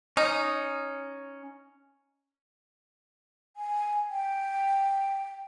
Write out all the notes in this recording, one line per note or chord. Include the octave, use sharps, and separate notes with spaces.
C#4 D#4
G#5
G5